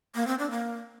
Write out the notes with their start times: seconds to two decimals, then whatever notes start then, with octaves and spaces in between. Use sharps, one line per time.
0.15 A#3
0.27 C4
0.39 D4
0.51 A#3